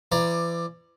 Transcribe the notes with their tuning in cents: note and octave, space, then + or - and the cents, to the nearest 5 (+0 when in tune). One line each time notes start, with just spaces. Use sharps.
E3 +40 D5 +15 A#5 +20